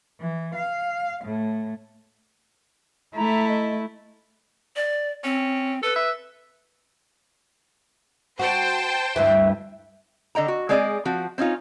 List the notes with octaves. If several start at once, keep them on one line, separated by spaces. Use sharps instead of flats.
E3
F5
A2
A3 E4 A#5
D#5
D5
C4 C#4
A4 B4
E5
F#4 C5 G5 A5
D2 G2 E3 E5
D3 D#5 G5 A#5
F#4
G#3 C4 G#4 D5 D#5
F3 C4 F#4
C4 C#4 D#4 F4